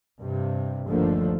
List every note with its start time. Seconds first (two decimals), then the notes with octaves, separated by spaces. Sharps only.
0.18 G2 C3
0.88 G1 D#2 D3 F3 A3 A#3